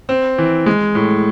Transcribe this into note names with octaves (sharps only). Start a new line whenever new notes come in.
C4
E3
G#3
A2